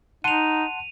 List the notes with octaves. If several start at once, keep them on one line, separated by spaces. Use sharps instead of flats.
D#4 F#5 A5 C6 D#7 F7